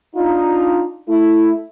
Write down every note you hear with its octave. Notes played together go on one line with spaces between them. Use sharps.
D4 D#4 F4
A3 E4